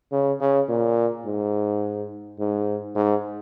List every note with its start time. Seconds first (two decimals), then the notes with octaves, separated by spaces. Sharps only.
0.12 C#3
0.40 C#3
0.69 A#2
1.26 G#2
2.39 G#2
2.96 G#2